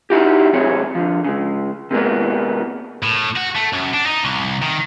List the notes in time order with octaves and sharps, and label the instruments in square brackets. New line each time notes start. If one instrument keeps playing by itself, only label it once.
[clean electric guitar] D#4 E4 F#4 G4
C2 F#3 C4 G#4 C#5
D3 F3
C#3 G#3
C3 G#3 A#3 B3
[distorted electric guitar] A2
F#4
A3
F#2
D4
D#4
C2
D#3